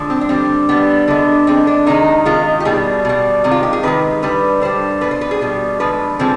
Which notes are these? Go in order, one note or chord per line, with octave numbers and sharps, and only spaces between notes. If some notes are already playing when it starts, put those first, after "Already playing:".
Already playing: D3 F3 G#3
C4
D4
D3 G3 C4
D3 G3 B3
D3 G#3 B3
D3 G#3 C4
D4
C3 D#3 G#3 D#4
C3 D#3 G#3 F4
G4
B2 G3 G#4
B2 G3
C3 D#3 G#3
F4
G4
G#4
C3 D#3 G#3 B4
D3 G3 B4
D3 G3 C5
B2 G3 B4
C5
B4
G#4
B2 G3
D3 F3 G#3 B4
D3 F3 G#3 C4